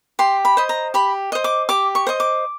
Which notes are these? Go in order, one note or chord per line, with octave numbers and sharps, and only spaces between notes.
G4 C6
B5
C5 D#5
A#5
G4 B5
C5 D#5
D6
G4 D6
C#6
C5 D#5
D6